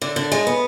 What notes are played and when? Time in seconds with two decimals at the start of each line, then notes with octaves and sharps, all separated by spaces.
0.02 D3
0.16 D3
0.32 G#3
0.47 B3